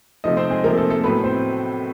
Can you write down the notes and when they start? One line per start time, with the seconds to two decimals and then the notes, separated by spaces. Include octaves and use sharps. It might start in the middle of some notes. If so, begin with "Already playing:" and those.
0.24 C3 F3 A3 D#4 D#5
0.37 C4 C5
0.51 G#3 G#4
0.64 C3 F3 A3 A#3 A#4
0.77 A3 A4
0.90 A3 A4
1.04 A2 F#3 A3 B3 B4
1.24 C4 C5